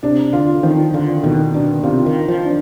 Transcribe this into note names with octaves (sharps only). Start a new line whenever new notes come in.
C3 D4
D3 F4
D#3 F3
D3 F4
B2 D#3
B2 D4
C3 F4
D#3
F4
F3
D4